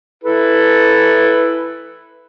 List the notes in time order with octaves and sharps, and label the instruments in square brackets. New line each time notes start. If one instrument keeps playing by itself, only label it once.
[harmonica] E4 A4 B4